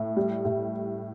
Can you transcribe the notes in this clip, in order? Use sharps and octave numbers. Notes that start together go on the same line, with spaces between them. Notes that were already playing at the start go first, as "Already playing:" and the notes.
Already playing: A2
G3
A2